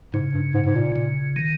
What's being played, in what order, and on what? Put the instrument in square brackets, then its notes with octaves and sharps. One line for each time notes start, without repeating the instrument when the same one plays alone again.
[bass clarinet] G#2 [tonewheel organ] C#3
[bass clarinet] G2
G#2
G#2
A#2
[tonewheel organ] C#3
D#3